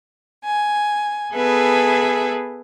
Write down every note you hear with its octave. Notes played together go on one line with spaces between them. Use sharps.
G#5
B3 G#4 A4 B4 E5 G#5